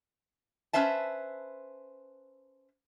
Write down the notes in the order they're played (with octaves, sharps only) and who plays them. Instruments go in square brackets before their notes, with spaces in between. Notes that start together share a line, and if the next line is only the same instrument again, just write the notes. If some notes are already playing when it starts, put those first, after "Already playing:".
[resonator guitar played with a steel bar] C#4 B4 C5 E5 A5